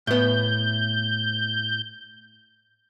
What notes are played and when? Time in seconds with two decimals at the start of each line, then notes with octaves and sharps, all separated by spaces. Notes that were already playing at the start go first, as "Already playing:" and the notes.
0.07 A2 B3 G6